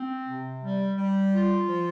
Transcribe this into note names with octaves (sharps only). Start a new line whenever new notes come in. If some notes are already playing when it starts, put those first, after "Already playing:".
Already playing: C4
C3
G3
G3
F4
F3